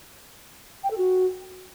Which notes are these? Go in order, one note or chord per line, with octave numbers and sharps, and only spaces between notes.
G5
A4
F#4